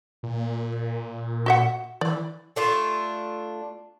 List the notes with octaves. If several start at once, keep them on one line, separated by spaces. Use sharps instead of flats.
A#2
F#4 E5 F#5
E3 D5
A3 D4 F4